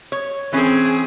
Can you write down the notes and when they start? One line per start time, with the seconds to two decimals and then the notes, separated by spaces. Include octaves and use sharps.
0.12 C#5
0.53 E3 C4 C#4 G#4